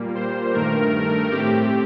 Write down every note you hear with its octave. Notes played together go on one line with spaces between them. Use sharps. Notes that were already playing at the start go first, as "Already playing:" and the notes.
Already playing: A#2 G3 A#3
C5
G2 D#3 A3 A#4
A2 A3 C4 G4